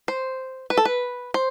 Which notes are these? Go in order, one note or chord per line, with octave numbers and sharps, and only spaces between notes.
C5
B4
A4
B4
C5